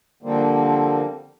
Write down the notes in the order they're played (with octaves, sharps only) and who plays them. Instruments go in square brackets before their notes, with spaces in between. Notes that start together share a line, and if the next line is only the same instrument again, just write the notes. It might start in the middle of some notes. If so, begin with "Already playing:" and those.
[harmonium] D3 F3 G3 A#3 C4